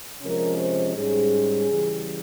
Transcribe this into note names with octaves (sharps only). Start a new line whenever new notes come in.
C3 F3 G#3 C#4 A#4
C5
G#2 G3 C#4 G#4
C#3 E3 G3